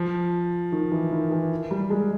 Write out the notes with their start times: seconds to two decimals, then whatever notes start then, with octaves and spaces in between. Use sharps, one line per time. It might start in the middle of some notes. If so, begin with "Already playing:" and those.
Already playing: F3
0.72 D#3
0.92 E3
1.11 D#3
1.31 E3
1.71 G3
1.90 G#3